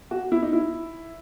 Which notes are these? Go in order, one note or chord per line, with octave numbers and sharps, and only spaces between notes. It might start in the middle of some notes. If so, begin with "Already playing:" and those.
F#4
E4
D#4
E4